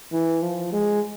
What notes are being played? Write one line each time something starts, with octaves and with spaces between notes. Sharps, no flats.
E3
F3
G#3